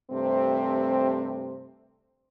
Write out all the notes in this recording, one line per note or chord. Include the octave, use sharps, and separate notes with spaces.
G2 C3 A3 C4